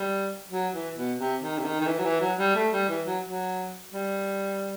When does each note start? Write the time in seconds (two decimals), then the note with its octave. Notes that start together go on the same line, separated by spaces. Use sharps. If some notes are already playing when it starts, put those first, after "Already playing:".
Already playing: G3
0.51 F#3
0.74 E3
0.97 B2
1.19 C3
1.42 D#3
1.58 C3
1.65 D#3
1.81 D#3
1.87 E3
1.98 F#3
2.04 E3
2.21 F#3
2.38 G3
2.55 A3
2.72 G3
2.89 E3
3.06 F#3
3.24 F#3
3.91 G3